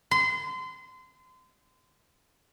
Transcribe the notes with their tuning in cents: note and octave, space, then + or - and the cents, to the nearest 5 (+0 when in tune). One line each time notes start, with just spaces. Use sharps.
C6 -30